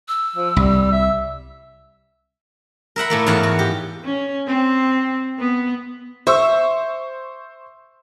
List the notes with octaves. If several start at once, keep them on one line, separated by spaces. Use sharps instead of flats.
E6
F3
C2 G3
E5
A#4 E5 F#5 B5
A2 A3 A#3
E2 G#2 C#5 F5 F#5
F#4
G4
C#4
C4
B3
C5 E5 C#6 E6